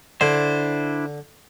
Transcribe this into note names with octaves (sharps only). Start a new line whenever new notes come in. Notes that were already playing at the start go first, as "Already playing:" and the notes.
D3 D4 E4 C5